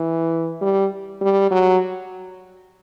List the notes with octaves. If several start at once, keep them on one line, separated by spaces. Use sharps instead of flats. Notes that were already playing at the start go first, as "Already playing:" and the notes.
Already playing: E3
G3
G3
F#3